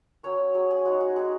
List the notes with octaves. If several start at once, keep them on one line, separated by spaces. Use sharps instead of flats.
F#3 C#4 C#5
F#3 C#4 G#4
G#4
G#3 D#4 F#4
F#4
G#3 D#4 G#4